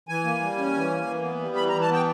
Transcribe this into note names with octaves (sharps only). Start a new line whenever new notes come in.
E3 G#5
A#3
G3
C#4
E3
A#3
E3
B3
G3
E3 B5
A#5
E3
A5
B3 G5